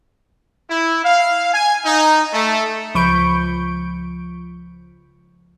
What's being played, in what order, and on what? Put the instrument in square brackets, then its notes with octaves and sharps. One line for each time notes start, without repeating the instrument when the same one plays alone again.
[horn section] E4
F5
G#5
D#4
A3
[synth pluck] C#2 F3 B5 C#6 G6 D7